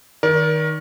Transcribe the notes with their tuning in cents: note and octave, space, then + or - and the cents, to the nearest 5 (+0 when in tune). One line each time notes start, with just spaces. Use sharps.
D#3 +0 A#4 +25 D5 -25